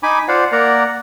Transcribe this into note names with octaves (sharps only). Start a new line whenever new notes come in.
D#4 G#5 B5 D6
F4 C5 D5 F5 F#5
A#3 A#4 D5 F#5 A#5